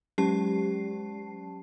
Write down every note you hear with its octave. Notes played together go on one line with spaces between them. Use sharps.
F#3 G#3 C#4 G4 A5 C7